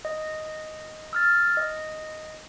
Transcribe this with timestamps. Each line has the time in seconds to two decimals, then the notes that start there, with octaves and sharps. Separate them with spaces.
0.05 D#5
1.13 E6 F6 A6
1.57 D#5